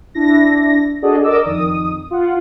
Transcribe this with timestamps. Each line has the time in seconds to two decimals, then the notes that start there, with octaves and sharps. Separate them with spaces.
0.15 D4 E4 A#6
1.02 D4 F#4 G#4 A4 D5 D#5
1.24 A#4 D5 D#5 D6 E6
1.44 F2 D#3 D#6
2.11 F4 F#5